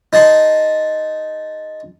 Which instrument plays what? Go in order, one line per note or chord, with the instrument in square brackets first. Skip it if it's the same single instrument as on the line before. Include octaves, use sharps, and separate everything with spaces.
[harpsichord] D#4 G#4 A5 C6